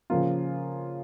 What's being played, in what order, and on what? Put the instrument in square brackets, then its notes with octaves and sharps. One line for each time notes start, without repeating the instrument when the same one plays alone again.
[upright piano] C#3 F3 A#3 F4